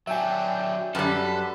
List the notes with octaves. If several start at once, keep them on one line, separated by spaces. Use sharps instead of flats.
F#3 D4 E5 G5 G#5
F#2 G3 A4 B4